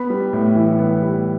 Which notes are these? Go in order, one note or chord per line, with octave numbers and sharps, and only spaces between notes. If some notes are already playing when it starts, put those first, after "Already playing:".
Already playing: B3 B5
G3
A2
E3
B3
G3